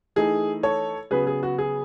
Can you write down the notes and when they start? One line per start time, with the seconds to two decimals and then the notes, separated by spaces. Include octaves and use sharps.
0.16 E3 A3 D#4 G#4
0.63 A4 C#5
1.11 C#3 F#3 B3 G#4 B4
1.27 G#4
1.43 F#4
1.58 G#4